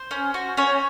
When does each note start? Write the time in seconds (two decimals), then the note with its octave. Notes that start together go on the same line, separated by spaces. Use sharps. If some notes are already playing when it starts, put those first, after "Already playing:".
Already playing: C5
0.11 C#4
0.34 F#4
0.57 C#4 C#5